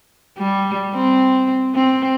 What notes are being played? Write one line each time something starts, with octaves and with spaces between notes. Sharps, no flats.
G3
C4
C4